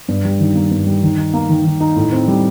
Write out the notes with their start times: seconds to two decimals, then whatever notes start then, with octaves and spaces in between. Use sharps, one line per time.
0.08 G2
0.25 G3
0.40 D#3
0.55 A#3
0.71 G2
0.86 G3
1.03 D#3
1.18 D#4
1.34 A#3
1.49 D#3
1.65 D#3
1.80 D#4
1.96 A2
2.12 C4
2.28 G3